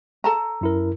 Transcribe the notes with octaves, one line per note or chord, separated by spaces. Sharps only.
A4 A5 A#5
F#2 E4 A#4